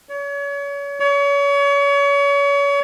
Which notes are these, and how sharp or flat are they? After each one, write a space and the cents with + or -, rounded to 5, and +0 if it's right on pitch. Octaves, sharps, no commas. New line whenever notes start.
C#5 +35
C#5 +35